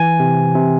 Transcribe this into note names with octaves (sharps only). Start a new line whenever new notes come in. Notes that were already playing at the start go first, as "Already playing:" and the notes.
Already playing: E3 G#5
C3
C3